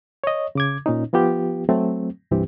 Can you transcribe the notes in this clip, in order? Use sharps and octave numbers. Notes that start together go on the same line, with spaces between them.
C#5 D#5
C#3 D6 G#6
A#2 C#4 D#4
F3 B3 F4 G4
F#3 A3 C4
C2 G2 E3 C4 G4